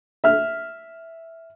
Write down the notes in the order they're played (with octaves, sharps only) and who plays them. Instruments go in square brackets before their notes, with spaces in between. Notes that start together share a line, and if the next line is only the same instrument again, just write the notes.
[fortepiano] E5 F6